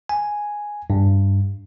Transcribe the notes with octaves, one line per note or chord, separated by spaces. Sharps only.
G#5
G2